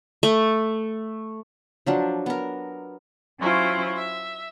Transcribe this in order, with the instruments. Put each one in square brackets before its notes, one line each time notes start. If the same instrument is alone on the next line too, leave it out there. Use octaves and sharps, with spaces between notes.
[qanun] A3
F3 F#3 D4
B3 A#4
[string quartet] F#3 C#4 E4 F4 C5
E5